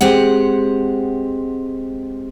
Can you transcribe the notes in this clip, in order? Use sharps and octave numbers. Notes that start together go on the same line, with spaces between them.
G#3 C4 G4 F#5